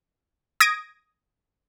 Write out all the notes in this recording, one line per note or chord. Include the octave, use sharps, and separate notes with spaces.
D#6 G#6 A#6 D7